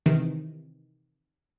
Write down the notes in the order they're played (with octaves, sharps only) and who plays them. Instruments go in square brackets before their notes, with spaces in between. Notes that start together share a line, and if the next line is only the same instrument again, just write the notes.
[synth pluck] C3 D#3 E3